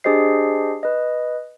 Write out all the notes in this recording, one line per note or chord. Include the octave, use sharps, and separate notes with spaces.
D4 G4 G#4 C5 D#5 C7
B4 D#5